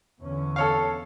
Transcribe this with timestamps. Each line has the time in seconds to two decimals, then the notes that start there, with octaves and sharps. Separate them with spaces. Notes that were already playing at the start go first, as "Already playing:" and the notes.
0.21 E2 D3 C#4
0.56 A4 C#5 F5